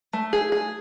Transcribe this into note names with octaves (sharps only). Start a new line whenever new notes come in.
A3
G#4
G#4